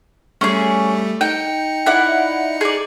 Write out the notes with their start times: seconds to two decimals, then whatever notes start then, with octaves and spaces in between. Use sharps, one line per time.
0.41 G3 A3 C#4 G#4
1.21 D#4 G5 C#7
1.86 E4 D5 F#5
2.61 G#4 D5